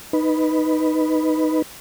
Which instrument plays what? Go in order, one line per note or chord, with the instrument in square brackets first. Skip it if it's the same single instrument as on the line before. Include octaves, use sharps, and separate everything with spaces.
[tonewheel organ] D#4 B4